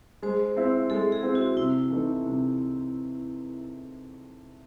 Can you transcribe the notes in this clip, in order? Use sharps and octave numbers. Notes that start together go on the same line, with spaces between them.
G#3 C5
C4 E4
G#3 A4
G#4
C4 E4
F#4
C3 E4
E3 A3 D#4
C3